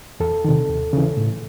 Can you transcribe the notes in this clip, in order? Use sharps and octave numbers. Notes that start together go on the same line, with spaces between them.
E2 A4
C3 D#3
D#2
C#3 E3
A2